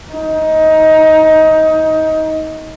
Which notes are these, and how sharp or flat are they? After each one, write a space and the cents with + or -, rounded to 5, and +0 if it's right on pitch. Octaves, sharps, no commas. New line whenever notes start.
D#4 +20